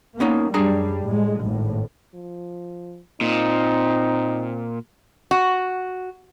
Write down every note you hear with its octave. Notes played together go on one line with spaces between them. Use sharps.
A#3 B3 C#4 D#4
F#2 G3 D4 G#4 A#5
A2 G#3
G#1 A2
F3
A#2 C4 D#4
F#4